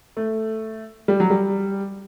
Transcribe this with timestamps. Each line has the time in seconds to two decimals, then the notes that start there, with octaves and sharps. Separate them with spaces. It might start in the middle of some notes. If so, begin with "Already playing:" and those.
0.17 A3
1.08 G3
1.20 F#3
1.30 G3